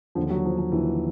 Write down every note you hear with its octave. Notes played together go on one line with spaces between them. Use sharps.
D#2 D3 F3
F#3
F3
F3
D#2 D3 E3